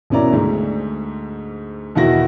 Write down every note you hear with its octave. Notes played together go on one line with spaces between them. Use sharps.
G#1 B2 C#4 E4 D5 A#5
D2 G#2
E2 B2 D#3 E4 F#4 A#6